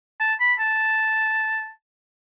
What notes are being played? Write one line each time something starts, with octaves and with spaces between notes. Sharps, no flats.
A5
B5
A5